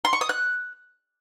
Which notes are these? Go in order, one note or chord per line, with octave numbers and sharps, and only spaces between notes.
C6
C#6
D#6
F#6